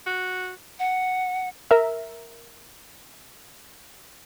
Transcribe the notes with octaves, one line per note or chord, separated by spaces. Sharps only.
F#4
F#5
A#4 E5